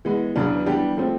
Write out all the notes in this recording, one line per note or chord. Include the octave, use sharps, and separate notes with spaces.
E3 G#3 B3
E2 C#3 F#3 B3 D4
E3 G3 B3 D4 G4
F3 A3 C4